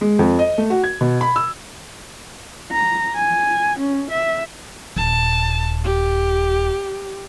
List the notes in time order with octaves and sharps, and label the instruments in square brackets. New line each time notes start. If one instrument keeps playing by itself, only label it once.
[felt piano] G#3
F2
D#5
A3
F#4
G#6
B2
B5
E6
[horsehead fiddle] A#5
G#5
C#4
E5
[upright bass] D#1 [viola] A5
[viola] G4